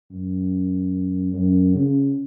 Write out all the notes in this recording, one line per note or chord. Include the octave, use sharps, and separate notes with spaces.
F#2
F#2
C#3